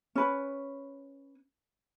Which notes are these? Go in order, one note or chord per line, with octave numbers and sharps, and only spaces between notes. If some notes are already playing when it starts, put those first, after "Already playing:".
C#4 B4